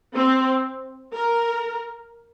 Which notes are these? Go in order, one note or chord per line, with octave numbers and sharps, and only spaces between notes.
C4
A#4